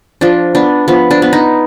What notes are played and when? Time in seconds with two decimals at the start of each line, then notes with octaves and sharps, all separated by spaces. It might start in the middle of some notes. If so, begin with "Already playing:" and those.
0.21 F3 D4
0.55 B3 D4
0.88 F3 B3
1.11 D4
1.22 B3
1.33 D#4